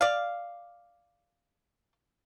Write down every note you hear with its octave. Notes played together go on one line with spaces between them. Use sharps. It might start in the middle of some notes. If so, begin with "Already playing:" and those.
D5 F5